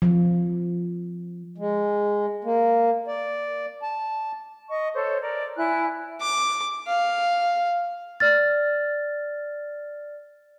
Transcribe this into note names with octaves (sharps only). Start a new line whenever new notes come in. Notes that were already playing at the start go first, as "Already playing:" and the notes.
F3
G#3
A#3
D5
A5
D#5 C#6
A4 C5 C#5
A#4 D5
E4 G#5 F#6
D6
F5
D5 F6 A6